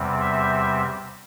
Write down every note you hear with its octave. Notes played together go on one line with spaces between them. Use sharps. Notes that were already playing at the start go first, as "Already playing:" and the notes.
Already playing: E2 C3 G3 C4
E5